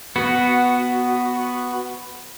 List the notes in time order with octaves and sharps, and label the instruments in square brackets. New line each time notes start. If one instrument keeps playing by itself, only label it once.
[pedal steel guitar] B3 F#4